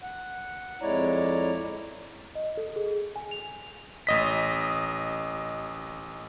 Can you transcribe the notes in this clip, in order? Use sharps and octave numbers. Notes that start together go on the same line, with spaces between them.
F#5
F2 G#3 E4 C#5 D5 A#5
D#5
A4
G#4
G#5
F7
A1 D#5 B6